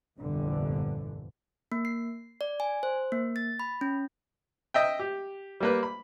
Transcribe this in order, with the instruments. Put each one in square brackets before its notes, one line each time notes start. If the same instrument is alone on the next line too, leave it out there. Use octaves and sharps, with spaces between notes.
[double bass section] G1 C2 F2 A#2 D3 E3
[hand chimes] A#3
C7
D5
G#5
C5
A#3
A6
B5
C#4
[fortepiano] D#5 E5 G5
G4
G3 A#3 B4
B5